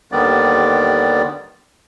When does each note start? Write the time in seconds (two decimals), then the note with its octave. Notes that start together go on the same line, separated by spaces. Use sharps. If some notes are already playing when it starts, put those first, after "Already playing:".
0.12 D#2 D3 D#3 G3 B3 D5